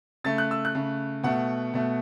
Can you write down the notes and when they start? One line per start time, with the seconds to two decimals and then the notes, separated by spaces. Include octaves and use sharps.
0.24 C#3 A3 A6
0.38 F#6
0.51 E6
0.65 F#6
0.75 C#3 A3
1.23 B2 A3 F#5
1.74 B2 A3